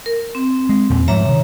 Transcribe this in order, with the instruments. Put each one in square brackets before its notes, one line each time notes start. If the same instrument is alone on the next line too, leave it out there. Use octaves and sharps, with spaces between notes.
[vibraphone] A#4
C4
[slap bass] G#3
E2 A#2 E3
[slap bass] G#2 F3 G3 [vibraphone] C#5 E5 A#5
[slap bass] C3 D#3